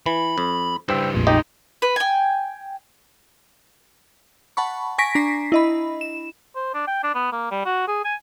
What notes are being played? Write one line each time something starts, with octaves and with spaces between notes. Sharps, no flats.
E3 B5
F2
G2 C#3 E4 C5 G5 E6
A#1 F2 A#2 A3 G#4
D#4 G4
B4
G5 G#5
F#5 A5 B5 C#6
G#5 C#6 A#6 B6 D7
D4 A#5 B6 C7
E4 D#5 B5
E7
C5
D4
G5
D4
B3
A#3
G3
F#4
G#4
G#5